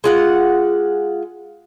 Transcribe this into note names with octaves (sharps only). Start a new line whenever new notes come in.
G#3 F4 F#5